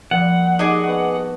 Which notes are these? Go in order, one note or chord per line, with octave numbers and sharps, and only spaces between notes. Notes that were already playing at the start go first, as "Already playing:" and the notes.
A#2 F3 G3 F#5
D#4 G#4 D5 D#5 A5
B3 F#4